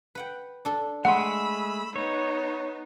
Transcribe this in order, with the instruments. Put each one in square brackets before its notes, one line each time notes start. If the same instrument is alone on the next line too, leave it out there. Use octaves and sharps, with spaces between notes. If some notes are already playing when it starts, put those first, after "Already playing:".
[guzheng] B4 F#5 G5
D4 A4
[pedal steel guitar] G#3 A3 G#4 [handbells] F#5 C6 [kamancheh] B5 E6
[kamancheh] B3 D#4 [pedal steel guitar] C#5